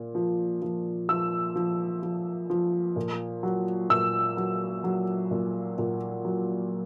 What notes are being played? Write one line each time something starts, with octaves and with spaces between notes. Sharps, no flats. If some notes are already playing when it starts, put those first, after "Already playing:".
Already playing: A#2
F3
F3
F3 E6
F3
F3
F3
A#2
F#3
A#2 E6
F#3
F#3
A#2
A#2
F#3